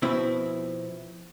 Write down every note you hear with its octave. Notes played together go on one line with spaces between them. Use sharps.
B2 F3 C4 E4